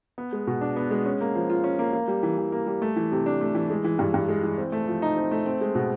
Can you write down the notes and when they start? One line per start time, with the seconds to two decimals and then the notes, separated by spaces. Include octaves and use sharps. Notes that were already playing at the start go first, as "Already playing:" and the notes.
0.18 B3
0.33 G#3
0.47 B2
0.61 D4
0.76 B3
0.91 G#3
1.06 C#4
1.21 A#3
1.35 F3
1.50 F4
1.64 C#4
1.79 A#3
1.93 A#3
2.08 G3
2.23 E3
2.38 E3
2.52 A#3
2.67 G3
2.82 A3
2.96 E3
3.12 C3
3.26 D4
3.41 A3
3.55 E3
3.70 G#3
3.84 E3
3.99 G2
4.14 G2
4.28 G#3
4.43 E3
4.58 C4
4.72 A3
4.87 F3
5.02 D#4
5.17 C4
5.31 A3
5.46 C4
5.61 G#3
5.75 B2